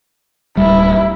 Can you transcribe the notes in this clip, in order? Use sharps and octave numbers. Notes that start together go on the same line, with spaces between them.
D1 G3 E4